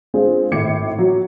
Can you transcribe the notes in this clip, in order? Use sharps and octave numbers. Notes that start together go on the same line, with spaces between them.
G#3 C4 D4 F4 G#4
G#1 A2 D6 G#6 C7 C#7
F#3